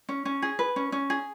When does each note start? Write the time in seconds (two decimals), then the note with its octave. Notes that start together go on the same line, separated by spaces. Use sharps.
0.09 C#4
0.25 C#4
0.42 G#4
0.59 B4
0.76 C#4
0.92 C#4
1.10 G#4